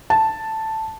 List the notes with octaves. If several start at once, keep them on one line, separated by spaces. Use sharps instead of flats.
A5